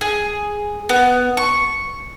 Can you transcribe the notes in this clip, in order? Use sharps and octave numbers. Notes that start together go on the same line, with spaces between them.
G#4
B3
C#6